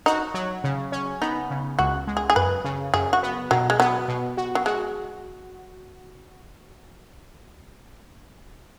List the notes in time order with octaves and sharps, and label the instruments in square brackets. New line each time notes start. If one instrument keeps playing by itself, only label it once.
[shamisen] D#4 [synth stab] F#4
[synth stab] F#3
C#3
C#4
[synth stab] B3 [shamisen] D#4
[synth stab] C#3
[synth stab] C#2 [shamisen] F#4
[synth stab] G#3
[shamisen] G#4
G#4
[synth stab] F#2 [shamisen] B4
[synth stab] C#3
[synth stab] F#2 [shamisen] G#4
[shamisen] F#4
[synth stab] B3
[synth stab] B2 [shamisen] F#3
[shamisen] G#3
[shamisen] F#3 [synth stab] B3
[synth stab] B2
F#4
[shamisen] F#3
[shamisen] G#3 [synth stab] F#4